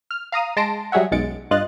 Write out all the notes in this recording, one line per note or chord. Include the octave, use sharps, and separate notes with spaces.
F6
F5 A#5 D#6 D#7
G#3 A5 C6 A#6 D7
F#3 G3 G#4 C#5 E5 F#5
B1 F#2 G#3 A6 C#7 D7
G2 F4 D#5 F#6 A6